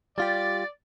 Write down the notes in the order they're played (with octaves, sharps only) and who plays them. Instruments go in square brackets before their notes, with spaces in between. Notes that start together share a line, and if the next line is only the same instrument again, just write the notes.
[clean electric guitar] G3 F4 G4 [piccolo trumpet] D5 [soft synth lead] A6